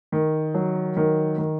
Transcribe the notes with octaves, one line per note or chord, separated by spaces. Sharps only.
D#3
F#3
D#3
D#3